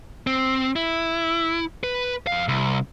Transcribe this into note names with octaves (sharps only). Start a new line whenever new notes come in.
C4
E4
B4
F2 F5
C2